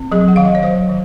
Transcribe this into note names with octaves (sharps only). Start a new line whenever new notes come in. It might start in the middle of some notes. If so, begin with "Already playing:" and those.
Already playing: C4
F#3 G#4
F#5
D#3 F5
D#5
C#5
F#3 C5
D#3